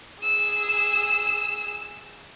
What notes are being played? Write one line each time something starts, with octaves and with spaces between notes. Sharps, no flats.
G#4 E6